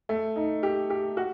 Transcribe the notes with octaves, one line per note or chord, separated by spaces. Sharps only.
A3
D#4
G4
G4
F#4